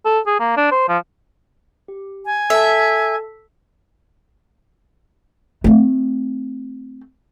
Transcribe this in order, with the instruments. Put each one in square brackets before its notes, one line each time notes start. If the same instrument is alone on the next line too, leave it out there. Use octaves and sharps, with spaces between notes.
[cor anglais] A4
G#4
A#3
D4
C5
F3
[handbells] G4
[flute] G#5
[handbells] A4 A5 [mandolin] E5
[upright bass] A3 C4